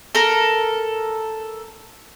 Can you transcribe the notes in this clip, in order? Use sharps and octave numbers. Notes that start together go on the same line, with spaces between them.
A4 A#4